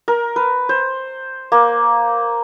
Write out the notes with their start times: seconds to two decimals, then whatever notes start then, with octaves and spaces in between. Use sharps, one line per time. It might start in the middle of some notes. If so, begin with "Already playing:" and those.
0.08 A#4
0.36 B4
0.69 C5
1.52 A#3